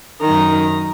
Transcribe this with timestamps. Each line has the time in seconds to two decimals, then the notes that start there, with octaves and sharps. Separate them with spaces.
0.21 F#2 D#3 A#5